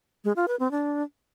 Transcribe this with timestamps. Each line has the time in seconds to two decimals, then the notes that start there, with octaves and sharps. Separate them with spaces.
0.24 G#3
0.36 F4
0.48 B4
0.60 C4
0.71 D4